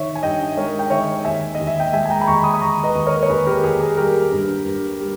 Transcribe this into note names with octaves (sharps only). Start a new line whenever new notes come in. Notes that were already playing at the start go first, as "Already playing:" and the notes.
Already playing: D#3 C#5 E5
G#5
G2 D#5 G5
G#3 A#4 C#5
G5
D#3 C#5 E5
D#2 E5 G#5
D#5
D#2
E5
G5
G#3 E5 G#5
G#5
G5 A#5
B5
D#2 A#5 C#6
B5 D#6
D#6
D#2 A#5 C#6
B4 D#5
D#2
A#4 C#5
C#5
D#2 G#4 B4
G4 A#4
D#2 G#4
G#4
G3 G4 A#4
G2
G2
G3